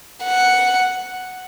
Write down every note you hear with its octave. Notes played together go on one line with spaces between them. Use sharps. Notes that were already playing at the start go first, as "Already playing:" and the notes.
F#5